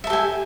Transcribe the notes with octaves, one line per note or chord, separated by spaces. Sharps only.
G4 A4 E5 G#5